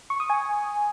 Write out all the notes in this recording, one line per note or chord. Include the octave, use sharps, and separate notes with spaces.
C#6
D#6
G#5